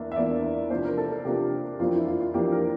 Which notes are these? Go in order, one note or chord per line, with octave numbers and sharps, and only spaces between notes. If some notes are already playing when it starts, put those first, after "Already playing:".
Already playing: E2 E3 A#3 D4 E5
E5
E2 E3 A#3 D4 D5
C3 F3 A#3 D4 C5
A#4
A4
A4
C3 F3 A#3 D4 G4
F2 E3 A#3 D4 F4
E4
F4
F4
F2 E3 A#3 D4 G4
A#4